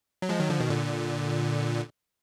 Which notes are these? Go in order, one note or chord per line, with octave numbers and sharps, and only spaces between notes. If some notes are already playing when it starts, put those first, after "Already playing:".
F#3
F3 G#3
D#3 F#3
D3 F3
B2 D#3
A#2 D3